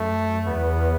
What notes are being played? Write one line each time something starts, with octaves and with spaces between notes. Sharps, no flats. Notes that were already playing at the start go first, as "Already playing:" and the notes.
Already playing: F#2 A3
E2 B3